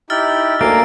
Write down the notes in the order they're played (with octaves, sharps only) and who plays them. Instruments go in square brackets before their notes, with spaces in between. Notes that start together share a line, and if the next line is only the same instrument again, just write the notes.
[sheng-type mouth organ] D#4 E4 G4 [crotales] E6 F6 A6
[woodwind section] D2 [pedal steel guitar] A#3 [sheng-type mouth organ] G#5 [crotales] D7